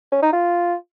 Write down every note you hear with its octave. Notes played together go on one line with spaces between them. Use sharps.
C#4
D#4
F4